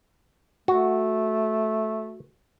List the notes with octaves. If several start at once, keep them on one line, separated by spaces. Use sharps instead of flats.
A3 F#4